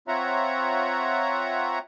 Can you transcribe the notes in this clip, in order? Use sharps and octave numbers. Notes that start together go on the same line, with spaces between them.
C4 F4 C#5 E5 F#5 A#5